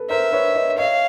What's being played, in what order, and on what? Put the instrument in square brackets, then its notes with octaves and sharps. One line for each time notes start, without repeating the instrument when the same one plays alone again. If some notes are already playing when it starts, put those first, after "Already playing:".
Already playing: [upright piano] A4 B4
[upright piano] A#4 C5 [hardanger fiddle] E5
[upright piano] B4 C#5
C#5 D#5
[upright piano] C#5 D#5 [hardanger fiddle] F5